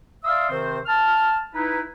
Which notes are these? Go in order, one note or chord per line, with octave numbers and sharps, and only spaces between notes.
D5 E5 F5 C6 D#6 E6
C3 D#3 C4 C5
A5 F6
D#4 E4 B4